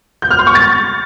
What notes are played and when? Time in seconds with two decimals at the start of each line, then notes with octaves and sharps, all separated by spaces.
0.22 G6
0.30 F6
0.39 C6
0.47 C#6
0.55 A6